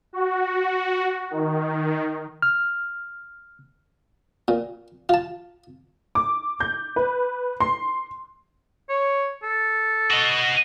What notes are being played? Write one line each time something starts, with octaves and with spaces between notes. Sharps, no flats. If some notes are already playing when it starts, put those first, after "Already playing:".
F#4
D#3
F6
A#2
F4 A5
D6
G6
B4
C6
C#5
A4
F#4 D#5